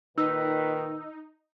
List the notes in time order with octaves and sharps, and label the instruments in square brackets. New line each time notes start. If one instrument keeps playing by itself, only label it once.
[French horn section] A#2 D#3 [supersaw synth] D#4 [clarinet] B4 [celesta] E6